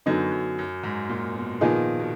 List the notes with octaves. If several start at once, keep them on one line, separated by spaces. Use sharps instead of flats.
F#2 D3 F#3 B3 D#4
F#2
F#2
G#2
A#2
B2
A#2 D#3 F3 B3 D#4 G#4
B2